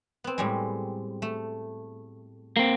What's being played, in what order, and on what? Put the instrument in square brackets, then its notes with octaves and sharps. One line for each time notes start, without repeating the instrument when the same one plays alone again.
[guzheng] B3 C4
A2 G3 G#3
A3
[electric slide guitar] A#3 C4